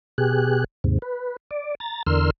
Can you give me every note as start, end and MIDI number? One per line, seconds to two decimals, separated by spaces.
0.18 0.64 47
0.18 0.64 67
0.18 0.64 68
0.18 0.64 90
0.84 0.99 39
0.84 0.99 44
0.84 0.99 48
1.02 1.36 71
1.51 1.75 74
1.80 2.03 82
1.80 2.03 93
2.07 2.30 40
2.07 2.30 50
2.07 2.30 70
2.07 2.30 84
2.07 2.30 88
2.07 2.30 89